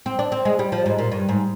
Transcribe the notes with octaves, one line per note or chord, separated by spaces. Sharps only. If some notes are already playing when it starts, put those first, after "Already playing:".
C4
D4
C4
G#3
G3
F3
G#2
A#2
G2
G#2